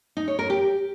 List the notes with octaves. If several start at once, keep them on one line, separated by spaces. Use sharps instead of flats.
D#4
C#5
A#4
G4